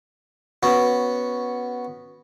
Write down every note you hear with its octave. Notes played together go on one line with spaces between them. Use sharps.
B3 C#4 F#4